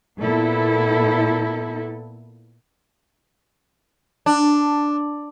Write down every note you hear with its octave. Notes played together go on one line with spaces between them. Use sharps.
A#2 B3 E4 A4
D4